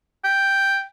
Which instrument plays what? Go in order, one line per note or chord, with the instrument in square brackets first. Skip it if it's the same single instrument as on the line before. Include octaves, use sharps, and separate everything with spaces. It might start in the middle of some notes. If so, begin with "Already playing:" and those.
[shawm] G5